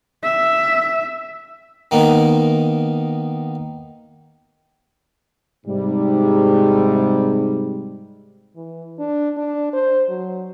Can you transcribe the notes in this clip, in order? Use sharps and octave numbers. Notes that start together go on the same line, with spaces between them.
E5
D#3 A#3 B3 D#4
G#2 C3 G3
E3
D4
D4
C5
F#3